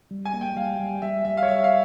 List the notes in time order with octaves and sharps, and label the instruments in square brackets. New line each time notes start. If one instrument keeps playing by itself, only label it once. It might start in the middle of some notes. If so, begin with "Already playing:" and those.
[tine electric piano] G3
[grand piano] G#5
[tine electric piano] A#3
[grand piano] G5
[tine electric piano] G3 [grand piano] F5
[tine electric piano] G3
[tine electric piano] G3 [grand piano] E5
[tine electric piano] G3 [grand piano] E5
[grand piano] F5
C#5
[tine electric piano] G3 [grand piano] E5
[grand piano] F5